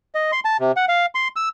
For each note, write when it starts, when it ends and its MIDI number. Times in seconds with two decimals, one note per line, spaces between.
0.15 0.31 75
0.32 0.40 84
0.45 0.57 81
0.60 0.72 48
0.77 0.85 78
0.89 1.06 77
1.15 1.28 84
1.36 1.49 88